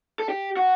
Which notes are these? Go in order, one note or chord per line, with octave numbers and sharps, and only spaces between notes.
A4
G4
F#4